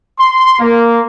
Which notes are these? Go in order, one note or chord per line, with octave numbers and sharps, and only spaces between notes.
C6
A#3